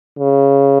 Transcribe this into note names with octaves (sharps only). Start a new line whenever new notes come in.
C#3